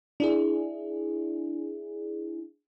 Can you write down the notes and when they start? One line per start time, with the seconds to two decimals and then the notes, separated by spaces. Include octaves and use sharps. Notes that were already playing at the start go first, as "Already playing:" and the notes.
0.20 D4 E4 G#4